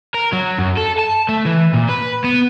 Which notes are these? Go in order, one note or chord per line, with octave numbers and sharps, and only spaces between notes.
A#4
F#3
F#2
A4
A5
A3
E3
A#2
B4
B3